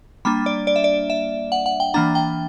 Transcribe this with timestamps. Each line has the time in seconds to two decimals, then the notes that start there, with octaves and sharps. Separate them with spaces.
0.25 G3 A#3 D4 B5
0.46 D5
0.67 D5
0.76 E5
0.84 D5
1.10 E5
1.52 F#5
1.66 F#5
1.80 G5
1.94 E3 A#3 D4 A#5
2.15 G5